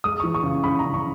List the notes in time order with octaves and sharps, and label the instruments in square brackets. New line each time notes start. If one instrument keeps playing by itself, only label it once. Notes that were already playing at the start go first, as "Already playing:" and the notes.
[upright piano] G#3 D#6
E3 C#6
C#6
C#3
C#3 B5
C#3 A#5
C#6